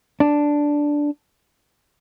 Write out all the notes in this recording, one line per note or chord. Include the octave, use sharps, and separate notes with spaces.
D4